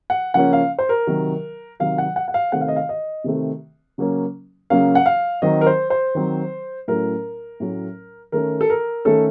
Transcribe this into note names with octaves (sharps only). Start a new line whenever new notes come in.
F#5
C#3 F3 A#3 C#4 F#5
F5
C5
A#4
C3 D#3 F#3
C3 D#3 F#3 F5
F#5
F#5
F#5
F5
C3 D#3 A3 C4 F#5
F5
D#5
F5
D#5
C3 D#3 A3 C4
C#3 F#3 A#3 C#4
C#3 F#3 A#3 C#4 F5
F#5
F5
D#3 F#3 C4 D#5
A#4
C5
C5
D#3 F#3 C4
A2 F#3 A3 C#4 A#4
A2 F#3 A3 C#4
D#3 A3 C#4 A#4
A4
A#4
D#3 A3 C#4 A4